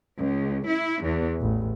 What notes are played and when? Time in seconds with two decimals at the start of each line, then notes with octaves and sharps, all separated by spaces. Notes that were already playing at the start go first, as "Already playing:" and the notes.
0.15 C#2
0.66 E4
1.01 E2
1.39 A1